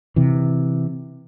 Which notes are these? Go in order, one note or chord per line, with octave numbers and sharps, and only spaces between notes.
C3 E3